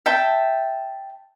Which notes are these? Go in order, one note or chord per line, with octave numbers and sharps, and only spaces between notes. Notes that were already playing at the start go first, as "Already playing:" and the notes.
E5 G5 A5